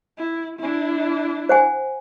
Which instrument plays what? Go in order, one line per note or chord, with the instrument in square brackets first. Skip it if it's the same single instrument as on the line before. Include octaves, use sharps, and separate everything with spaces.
[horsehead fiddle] E4
D4 E4
[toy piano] C5 F#5 G#5